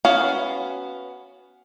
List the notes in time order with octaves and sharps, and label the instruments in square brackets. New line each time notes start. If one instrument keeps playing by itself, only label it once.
[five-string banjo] B3 C#4 F#4 F5